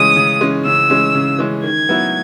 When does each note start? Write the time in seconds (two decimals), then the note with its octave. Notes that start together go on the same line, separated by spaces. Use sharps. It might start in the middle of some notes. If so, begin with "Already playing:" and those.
Already playing: C#3 E3 G#3 C#4 D#6
0.16 C#3
0.41 E3 G#3 C#4
0.65 C#3 E6
0.90 E3 G#3 C#4
1.15 C#3
1.39 E3 G#3 C#4
1.63 D#3 G#6
1.89 F#3 B3 E4